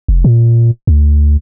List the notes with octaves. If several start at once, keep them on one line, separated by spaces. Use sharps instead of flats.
F1
A#2
D2